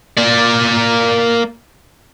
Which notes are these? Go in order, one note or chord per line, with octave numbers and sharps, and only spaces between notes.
A#3 D5